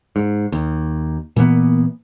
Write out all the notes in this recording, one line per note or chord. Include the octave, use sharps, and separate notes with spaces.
G#2
D#2
A#2 E3 A#3 B3